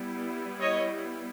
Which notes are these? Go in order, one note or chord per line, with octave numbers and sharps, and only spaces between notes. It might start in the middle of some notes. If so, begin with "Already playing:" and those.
Already playing: G3 B3 E4
C#5 D#5